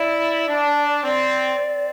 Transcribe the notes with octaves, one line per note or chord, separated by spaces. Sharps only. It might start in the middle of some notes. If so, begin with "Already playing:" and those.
Already playing: E4 D5
D4
C4 D5
C4